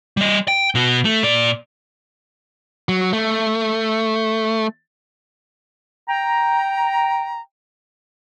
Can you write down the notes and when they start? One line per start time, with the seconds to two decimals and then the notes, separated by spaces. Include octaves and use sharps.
0.17 G3 D#5
0.48 G5
0.75 B2 F#4
1.05 A3
1.23 A#2 D5
2.89 F#3
3.13 A3
6.09 G5 A#5